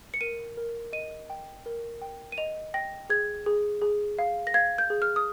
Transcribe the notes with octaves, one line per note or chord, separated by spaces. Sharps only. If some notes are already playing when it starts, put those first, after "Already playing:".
C#7
A#4 D#7
A#4
D#5 D#7
G5
A#4
G5
D#7
D#5 F7
G5 A#6
G#4 G#6
G#4
G#4
F5
A#6
F5 G#6
G6
G#4
F6
D#6